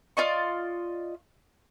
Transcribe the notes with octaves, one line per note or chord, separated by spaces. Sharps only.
F4 D5 D#5 C#6